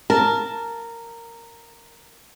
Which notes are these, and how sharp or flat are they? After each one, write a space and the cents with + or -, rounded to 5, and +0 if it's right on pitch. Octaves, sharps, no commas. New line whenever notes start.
A#4 -10 A5 -5